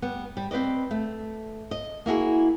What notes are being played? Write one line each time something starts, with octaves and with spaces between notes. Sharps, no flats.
G3 B3
G3
C4 B4 D5 D#5
A3
D#5
A#3 E4 F#4 G#4